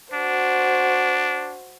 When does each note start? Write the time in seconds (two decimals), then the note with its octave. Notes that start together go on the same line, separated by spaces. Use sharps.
0.13 D4 F#4 C5